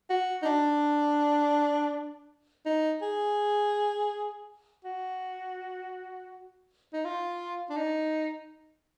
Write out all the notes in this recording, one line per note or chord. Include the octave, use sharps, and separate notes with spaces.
F#4
D#4
D4
D#4
G#4
F#4
D#4
F4
D4
D#4